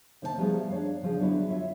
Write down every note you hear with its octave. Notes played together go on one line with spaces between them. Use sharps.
C3 D#3 A#3 C5 D5 A5
F3 G3 A3 B3 D#4 G#4
D4 C#5 F5
C#3 F3 D4 G#4
D3 F#3 B3 D4 E4
F4 C#5 E5